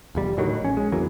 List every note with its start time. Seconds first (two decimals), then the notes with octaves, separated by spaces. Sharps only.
0.15 F1 E2 G3
0.37 A2 D3 D#3 F#3
0.61 A#1 C#4
0.77 G#3
0.92 F2 E3 F#3 A#3